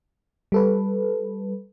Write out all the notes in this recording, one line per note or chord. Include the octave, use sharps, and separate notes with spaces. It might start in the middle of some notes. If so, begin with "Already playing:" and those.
G3 A4 B4